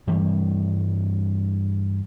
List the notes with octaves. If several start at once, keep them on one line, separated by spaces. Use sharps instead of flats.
G2 E3 G3 A3